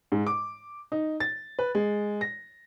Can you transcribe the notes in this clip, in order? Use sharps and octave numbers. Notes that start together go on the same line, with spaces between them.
G#2
D6
D#4
A6
B4
G#3
A#6